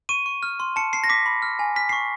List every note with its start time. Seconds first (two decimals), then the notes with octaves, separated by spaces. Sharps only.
0.09 C#6 D#7
0.26 C#6
0.43 F6
0.60 C6
0.76 A5 C#7
0.93 A5 C7
1.04 A#6
1.09 D6 B6
1.26 B5
1.42 F6
1.59 G#5
1.76 F6 B6
1.89 C#6 C7